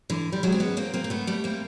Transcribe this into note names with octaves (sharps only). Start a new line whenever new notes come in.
D3 E3
G3
F#3 G#3
C4
B3 C#4
A#3 C4
A#3 C4
C4
A3 B3
G3 A3
A#3 C4